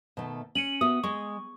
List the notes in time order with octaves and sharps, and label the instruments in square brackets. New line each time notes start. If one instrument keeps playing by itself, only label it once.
[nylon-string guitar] B2 D#3 A3
[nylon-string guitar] C#4 [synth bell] C#7 D#7 F#7
[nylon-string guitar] B3 F#4 E5 [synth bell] D#6
[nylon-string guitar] G#3 [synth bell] C#6